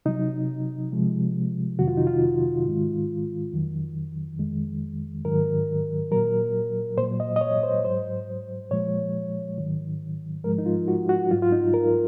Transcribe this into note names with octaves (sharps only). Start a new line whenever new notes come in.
C3 F#3 D#4
C3 F3 G#3
F2 C3 D#3 F#3 F#4
F4
D#4
F4
G#2 D#3 G#3
F2 D#3 F#3
F2 D#3 G#3
G#2 D#3 F#3 A#4
A#2 F#3 A#4
A#2 C5
F#3
D#5
D#5
C#5
C5
G#2 F#3 C5
A#2 F3 G#3 C#5
G#2 D#3 F#3
G#2 F3 G#3 A#4
D#4
F4
F#4
F#4
G#2 F#3 F4
F4
D#4
A#4